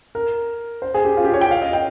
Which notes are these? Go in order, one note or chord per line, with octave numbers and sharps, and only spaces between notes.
A#4
C5
G#4
G4
F4
G4
C#5
G5
F5
D#5
G5